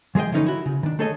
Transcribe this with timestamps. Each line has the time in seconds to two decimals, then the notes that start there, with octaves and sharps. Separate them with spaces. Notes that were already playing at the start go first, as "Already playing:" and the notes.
0.15 E3 G#3 G#4 D#5 G5
0.32 D3 F3 A3 C#4 D#4 B4
0.46 E4 F#4
0.66 C#3
0.83 D#3 D4
0.99 A3 G#4 A4 C#5 D#5